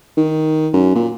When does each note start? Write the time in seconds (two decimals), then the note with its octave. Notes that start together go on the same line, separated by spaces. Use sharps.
0.17 D#3
0.73 F#2
0.95 A#2